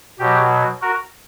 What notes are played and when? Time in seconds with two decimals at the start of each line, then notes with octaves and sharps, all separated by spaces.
0.19 B2 F#3 G4
0.82 F#4 A#4